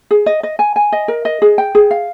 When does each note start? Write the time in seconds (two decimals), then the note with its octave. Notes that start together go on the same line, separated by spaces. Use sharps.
0.11 G#4
0.26 D#5
0.43 D#5
0.59 G#5
0.76 G#5
0.92 D#5
1.08 A#4
1.25 D#5
1.42 G#4
1.58 G5
1.75 G#4
1.91 F5